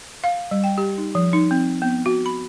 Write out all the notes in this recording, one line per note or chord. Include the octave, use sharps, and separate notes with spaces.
F5
G3
G5
G4
D#4
F3
D#4
C4
B3
F#4
B5